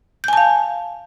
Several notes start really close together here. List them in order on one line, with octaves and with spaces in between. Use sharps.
G6 G#5 A5 F5